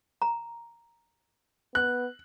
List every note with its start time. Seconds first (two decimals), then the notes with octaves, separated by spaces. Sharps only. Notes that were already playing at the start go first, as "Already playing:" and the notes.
0.22 A#5
1.75 B3 F#6